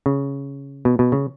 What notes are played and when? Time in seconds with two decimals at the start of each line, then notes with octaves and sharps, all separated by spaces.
0.06 C#3
0.85 B2
0.99 B2
1.12 C#3